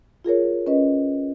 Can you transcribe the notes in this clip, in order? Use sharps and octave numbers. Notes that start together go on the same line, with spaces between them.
F4 G#4 A#4 C#5
C#4 B4 D#5